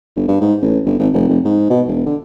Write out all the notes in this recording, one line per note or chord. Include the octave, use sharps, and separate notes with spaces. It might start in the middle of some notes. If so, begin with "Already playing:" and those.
G1
G2
G#2
A1
G1
G#1
F1
F1
G#2
B2
E1
D3